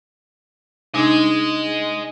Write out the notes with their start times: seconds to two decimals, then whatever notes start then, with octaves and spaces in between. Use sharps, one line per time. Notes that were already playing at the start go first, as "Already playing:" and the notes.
0.94 C3 D4 D#4 D#5 G#5